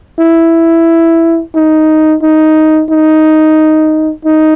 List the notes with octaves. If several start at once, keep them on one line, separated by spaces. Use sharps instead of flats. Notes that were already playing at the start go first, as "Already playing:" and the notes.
E4
D#4
D#4
D#4
D#4